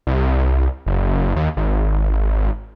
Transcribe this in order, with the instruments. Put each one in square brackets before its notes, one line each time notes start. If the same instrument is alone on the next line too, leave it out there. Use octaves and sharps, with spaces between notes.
[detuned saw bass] C2
F#1
D#2
G#1